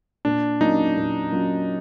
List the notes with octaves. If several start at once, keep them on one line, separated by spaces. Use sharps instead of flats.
A#2 D4
F#3 A#3 C#4 D#4 F4
A#2
F#3 A#3 C#4 F4